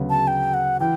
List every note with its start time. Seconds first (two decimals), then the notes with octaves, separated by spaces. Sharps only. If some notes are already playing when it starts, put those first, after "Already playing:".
Already playing: D2 C#3 F#3 B3
0.10 A5
0.27 G5
0.54 F#5
0.80 E3 G5